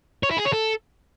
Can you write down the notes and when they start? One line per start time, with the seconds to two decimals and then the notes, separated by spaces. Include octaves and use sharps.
0.23 C#5
0.31 E4
0.38 G#4
0.45 C#5
0.53 A4